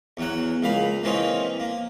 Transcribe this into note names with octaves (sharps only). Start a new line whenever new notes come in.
E2 F#3 F#5
C#2 A#3 F5 B5
E3 A#3 C4 C#4 D#4
A#3